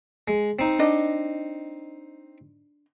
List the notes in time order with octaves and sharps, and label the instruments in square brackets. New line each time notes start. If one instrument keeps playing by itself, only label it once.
[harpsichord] G#3
C4 D#4
[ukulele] D4 D#5